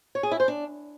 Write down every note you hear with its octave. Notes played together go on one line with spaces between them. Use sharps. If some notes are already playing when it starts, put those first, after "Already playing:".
C#5
G#4
E4
C5
D4